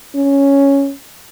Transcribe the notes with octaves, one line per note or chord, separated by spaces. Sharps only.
C#4